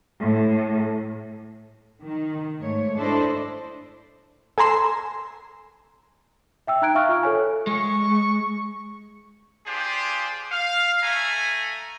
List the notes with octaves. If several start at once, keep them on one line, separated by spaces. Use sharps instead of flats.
A2
D#3
G#2 A3 C#5
D4 E4 A4 C5 D#5
A4 G#5 A#5 C6 E6
E5 G5 E6
D#4 G5 A#5 F#6 G#6 D7
E5 F5 C#6 F6
F4 F6
A4 C#5 G#5
G#3 C#6
D4 F4 G4 G#4 C5
F5
A3 E5 G#5 A#5